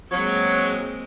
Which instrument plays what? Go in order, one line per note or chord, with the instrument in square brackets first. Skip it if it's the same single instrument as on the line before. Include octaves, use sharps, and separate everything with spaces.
[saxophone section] F#3 [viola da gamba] G#3 A#3 C4 [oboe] C#5